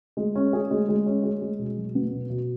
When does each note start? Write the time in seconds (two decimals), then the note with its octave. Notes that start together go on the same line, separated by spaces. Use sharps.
0.17 G#3
0.35 C#4
0.53 G#4
0.71 G#3
0.89 G#3
1.06 C#4
1.24 G#4
1.41 G#3
1.59 B2
1.77 F#3
1.95 B3
2.13 B2
2.30 B2